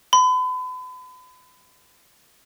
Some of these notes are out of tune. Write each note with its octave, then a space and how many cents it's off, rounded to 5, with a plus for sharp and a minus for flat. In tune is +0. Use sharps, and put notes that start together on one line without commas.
B5 +40